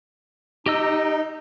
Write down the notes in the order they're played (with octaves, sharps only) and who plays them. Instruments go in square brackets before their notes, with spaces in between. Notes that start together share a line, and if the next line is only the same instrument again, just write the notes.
[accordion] D#4 [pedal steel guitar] G4 D#5 E6